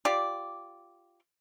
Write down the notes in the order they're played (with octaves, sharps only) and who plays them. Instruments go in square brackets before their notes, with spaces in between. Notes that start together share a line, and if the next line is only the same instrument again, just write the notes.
[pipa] F4 G4 D5